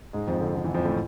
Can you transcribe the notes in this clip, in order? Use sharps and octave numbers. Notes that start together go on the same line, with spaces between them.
G#2 G#3
F2 F3
D3
D3
E3
F2 F3
A2 A3